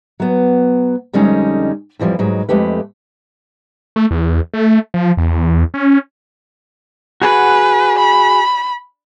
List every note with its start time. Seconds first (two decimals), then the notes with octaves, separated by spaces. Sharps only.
0.20 F#3 B3
1.13 F2 D3 G3 G#3 C#4 D#4
1.99 F2 E3 F3 G3
2.19 G#2 F#3 G#3
2.49 F2 G#3 A3 G4 B4
3.96 A3
4.11 E2
4.54 A3
4.94 F3
5.17 E2
5.74 C#4
7.22 F#4 G#4 B4 F#5
7.99 B5